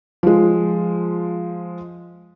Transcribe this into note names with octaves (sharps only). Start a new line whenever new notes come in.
F3 G#3